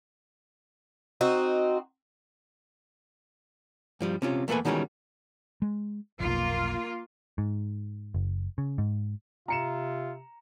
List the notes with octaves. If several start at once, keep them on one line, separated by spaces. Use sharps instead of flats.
C4 D#4 F#4
G2 F3 G3
C3 C#4 F4
E2 A3 A#3 A4 B4 G#5
B2 D#3 E3 G3 G#3 C#4
G#3
F1 B1 A#3 F4
G#2
F#1
C#3
G#2
C3 F4 A#5 C#7 E7